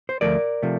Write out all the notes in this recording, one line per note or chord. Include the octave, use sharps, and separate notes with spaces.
C5
D2 C3 F3 A3 A#4 D5
C3 F3 A3